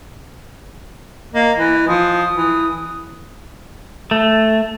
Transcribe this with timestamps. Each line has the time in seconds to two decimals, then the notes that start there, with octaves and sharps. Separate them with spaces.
1.34 A#3 D#5
1.57 E3
1.88 F3 D#6
2.34 E3
4.11 A3